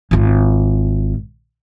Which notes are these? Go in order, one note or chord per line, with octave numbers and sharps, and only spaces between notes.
G#1 F4